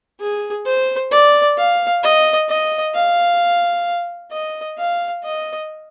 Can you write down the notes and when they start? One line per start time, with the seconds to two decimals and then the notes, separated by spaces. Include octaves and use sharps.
0.20 G#4
0.65 C5
1.12 D5
1.57 F5
2.03 D#5
2.49 D#5
2.95 F5
4.32 D#5
4.78 F5
5.23 D#5